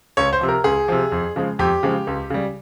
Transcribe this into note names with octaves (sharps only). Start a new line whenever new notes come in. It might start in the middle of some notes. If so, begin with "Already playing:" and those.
C#2 C#5
C5
C3 F3
A#4
C#2 G#4
C3 F3
F2
C#3 F3 G#3
F2 G4
C#3 F3 G#3
C#2
C#3 G3